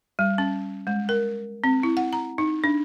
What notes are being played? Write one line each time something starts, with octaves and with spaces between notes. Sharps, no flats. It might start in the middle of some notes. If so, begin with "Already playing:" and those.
G3
C#4
G#3
A#4
C4
E4
F#5
A#5
D#4
D4